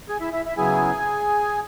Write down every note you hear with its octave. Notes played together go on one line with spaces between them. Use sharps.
G#4 G#5
E4 E5
E4 E5
E4 E5
C#3 F#3 B3 E4 G#4 G#5